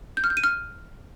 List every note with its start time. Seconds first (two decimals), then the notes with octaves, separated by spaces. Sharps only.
0.17 G6
0.24 F6
0.30 G6
0.37 D#7
0.44 F6